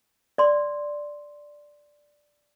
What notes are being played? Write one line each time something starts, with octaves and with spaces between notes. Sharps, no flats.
D5 C6